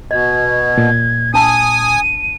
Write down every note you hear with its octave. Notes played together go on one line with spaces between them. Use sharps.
B2 D#5 G#6
A#2
D4 G#5 A5 D#6 E6 D#7